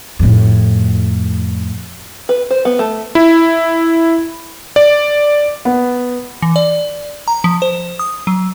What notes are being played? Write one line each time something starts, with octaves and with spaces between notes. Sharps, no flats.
F2 A2
B4
C5
B3
A3
E4
D5
B3
E3
D5
A#5
F3
C5
D#6
F#3